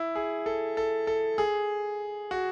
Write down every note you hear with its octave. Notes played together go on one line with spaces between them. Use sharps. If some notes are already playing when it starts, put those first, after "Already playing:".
Already playing: E4
G#4
A4
A4
A4
G#4
F#4